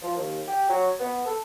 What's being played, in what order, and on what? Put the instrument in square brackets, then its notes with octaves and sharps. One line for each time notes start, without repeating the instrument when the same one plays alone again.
[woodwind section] F3
D#2
G4
F#3
B3
A4